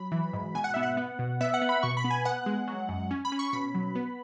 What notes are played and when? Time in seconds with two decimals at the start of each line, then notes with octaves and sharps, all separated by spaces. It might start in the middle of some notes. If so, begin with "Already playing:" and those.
Already playing: F#3 B5
0.12 E3
0.33 G#2
0.55 B2 G#5
0.64 F#5
0.74 B3 E5
0.83 F#5
0.97 B3
1.19 B2
1.41 B3 E5
1.54 F#5
1.62 B3
1.69 B5
1.83 B2 C#6
1.97 B5
2.04 B3
2.11 G#5
2.25 B3 F#5
2.46 G#3
2.68 F#3
2.89 F#2
3.11 C#4
3.25 B5
3.32 C#4
3.39 C#6
3.53 B2 B5
3.74 F#3
3.95 B3